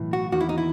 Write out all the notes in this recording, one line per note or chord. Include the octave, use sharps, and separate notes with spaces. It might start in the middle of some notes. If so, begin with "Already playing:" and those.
Already playing: B1 A2 E3
F#4
E2 D#3 F#4
E4
D#4
E4